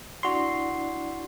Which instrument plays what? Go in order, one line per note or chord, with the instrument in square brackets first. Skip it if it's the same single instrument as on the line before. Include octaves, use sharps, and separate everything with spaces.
[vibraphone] D4 E4 D5 [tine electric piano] F#4 C6